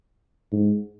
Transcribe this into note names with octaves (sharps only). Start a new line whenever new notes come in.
G#2